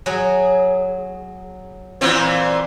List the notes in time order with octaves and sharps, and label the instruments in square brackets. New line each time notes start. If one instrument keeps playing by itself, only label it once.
[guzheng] F#3 F#4 G#4
[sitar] A#2 E3 C4